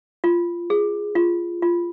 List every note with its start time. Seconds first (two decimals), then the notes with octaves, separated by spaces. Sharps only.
0.24 F4
0.70 G#4
1.15 F4
1.62 F4